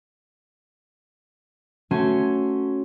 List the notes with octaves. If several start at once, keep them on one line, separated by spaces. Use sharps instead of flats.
A3 C#4 F#4 C#5 C6